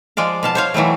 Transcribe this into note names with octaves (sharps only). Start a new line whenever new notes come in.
F3 G#3 D5 F5
B2 F5 A5
C5 C#5 F5
E3 F#3 G3 A3